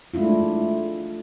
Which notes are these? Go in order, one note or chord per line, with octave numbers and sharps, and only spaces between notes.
G#3 A3 D4 E4 F4